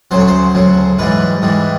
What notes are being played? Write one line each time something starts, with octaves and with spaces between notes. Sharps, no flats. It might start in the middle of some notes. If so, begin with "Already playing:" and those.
D2 C#3 F#3 C5
C#5
C5
D2 C#3 F#3
G#2 E3 G3 B4
G#2 E3 G3